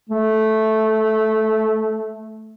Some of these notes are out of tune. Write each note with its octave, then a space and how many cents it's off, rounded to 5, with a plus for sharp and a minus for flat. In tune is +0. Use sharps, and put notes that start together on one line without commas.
A3 -10